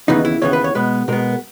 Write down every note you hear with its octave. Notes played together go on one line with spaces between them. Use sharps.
D#2 C#3 E3 B3 D#4
E4
D#2 C#3 E3 B3 C#5
B4
C#5
B2 G#3 B3 B4
B2 G#3 B3 A#4